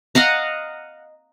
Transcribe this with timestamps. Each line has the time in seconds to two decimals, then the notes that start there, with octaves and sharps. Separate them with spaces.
0.15 D#5 F5 F#5 A#5